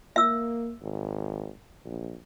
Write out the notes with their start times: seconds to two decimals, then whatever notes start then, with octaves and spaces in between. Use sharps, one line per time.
0.16 A#3 E5 E6
0.82 G#1
1.85 A#1